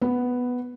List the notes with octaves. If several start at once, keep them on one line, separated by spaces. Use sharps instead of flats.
B3